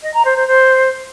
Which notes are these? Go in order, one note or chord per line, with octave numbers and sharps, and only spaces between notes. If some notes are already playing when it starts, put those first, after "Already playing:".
D#5
A#5
C5
C5
C5